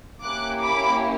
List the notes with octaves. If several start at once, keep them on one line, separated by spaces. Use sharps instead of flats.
A#3 C#4 E4 G4 D6 F#6
B5 D6